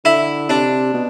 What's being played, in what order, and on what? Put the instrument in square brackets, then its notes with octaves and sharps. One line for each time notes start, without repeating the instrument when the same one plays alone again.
[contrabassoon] D3 [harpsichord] E4
[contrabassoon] C3 [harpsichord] D4
[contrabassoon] B2